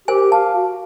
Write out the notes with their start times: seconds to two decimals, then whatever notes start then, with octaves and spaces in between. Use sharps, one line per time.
0.08 G4 A#4 C5 G#5
0.32 F5 A5
0.55 F#4